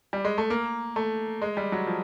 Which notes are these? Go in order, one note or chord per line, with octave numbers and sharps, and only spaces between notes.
G3
G#3
A3
A#3
A3
G#3
G3
F#3
F3